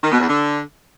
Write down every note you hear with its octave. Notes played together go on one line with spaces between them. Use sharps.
D#3
B2
E2
D3